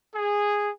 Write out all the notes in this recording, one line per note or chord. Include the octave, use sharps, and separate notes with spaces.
G#4